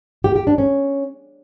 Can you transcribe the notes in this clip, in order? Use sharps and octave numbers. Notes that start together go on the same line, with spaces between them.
G4
G4
D4
C#4